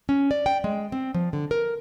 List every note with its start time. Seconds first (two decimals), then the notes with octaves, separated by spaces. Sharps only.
0.09 C#4
0.31 D5
0.46 G5
0.64 G#3
0.92 C4
1.14 F3
1.33 D3
1.51 A#4